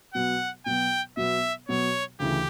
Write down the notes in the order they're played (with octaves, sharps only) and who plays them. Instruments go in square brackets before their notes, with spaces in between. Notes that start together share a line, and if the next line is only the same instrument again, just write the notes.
[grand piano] B2 F#3 B3 [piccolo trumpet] F#5
[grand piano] B2 F#3 B3 [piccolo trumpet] G5
[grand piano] B2 F#3 B3 [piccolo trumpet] E5
[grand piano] B2 F#3 B3 [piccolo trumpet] C#5
[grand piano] D2 C#3 E3 [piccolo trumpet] G4